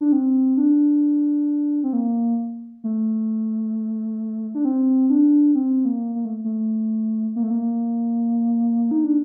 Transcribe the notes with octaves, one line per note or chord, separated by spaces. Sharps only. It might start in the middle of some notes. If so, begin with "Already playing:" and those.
D4
C4
D4
C4
A#3
A3
D4
C4
D4
C4
A#3
A#3
A3
A3
A#3
A3
A#3
D#4
D4